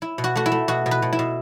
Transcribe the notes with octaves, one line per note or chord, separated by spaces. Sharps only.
E4
B2
F#4
A3 F#4
E4
A3
B2 F#4
B2
B4
B2
E4
B2